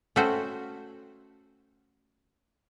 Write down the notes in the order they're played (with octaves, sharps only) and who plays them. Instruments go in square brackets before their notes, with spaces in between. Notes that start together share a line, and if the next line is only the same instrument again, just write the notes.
[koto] A3 C#4 F#4 C5 G5